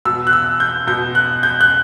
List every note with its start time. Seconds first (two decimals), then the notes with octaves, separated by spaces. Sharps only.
0.05 B2 E6
0.27 F#6
0.33 E6
0.60 G6
0.87 B2 G6
1.15 F#6
1.43 G6
1.61 F#6